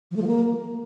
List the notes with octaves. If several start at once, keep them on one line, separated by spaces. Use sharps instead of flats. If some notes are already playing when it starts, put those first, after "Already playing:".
F3
A3
F3
A#3